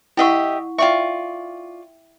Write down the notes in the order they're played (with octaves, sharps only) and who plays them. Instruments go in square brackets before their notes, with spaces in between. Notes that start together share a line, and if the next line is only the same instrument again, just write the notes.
[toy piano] E4 F#5 C#6 [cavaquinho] G4 D#5 E5
[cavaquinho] F4 D5 C#6 [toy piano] E5 G5